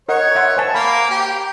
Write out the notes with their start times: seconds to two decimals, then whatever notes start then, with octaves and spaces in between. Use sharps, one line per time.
0.09 A#4 C#5 D#5 F#5
0.35 E5 F#5 C6
0.57 C5 G#5 A5
0.74 A#3 B5
1.10 G4